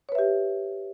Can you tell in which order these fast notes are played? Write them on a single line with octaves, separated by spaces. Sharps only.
C#5 B4 E5 G4